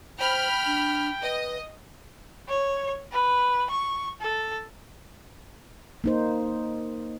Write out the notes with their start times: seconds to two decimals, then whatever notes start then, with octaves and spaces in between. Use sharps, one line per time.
0.20 C5 G5 B5 F6
0.66 D4
1.22 B4 D#5
2.49 C#5
3.12 B4
3.70 C#6
4.21 A4
6.04 A#3 D#4 C5